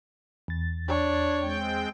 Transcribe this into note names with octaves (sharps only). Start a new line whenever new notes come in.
E2 A6
D4 C#5
G#3 C4 G5